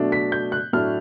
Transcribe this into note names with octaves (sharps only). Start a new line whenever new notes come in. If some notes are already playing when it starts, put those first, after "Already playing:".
Already playing: B2 F#3 A3 D4
B6
G6
F#6
A2 F#3 A3 D4 F6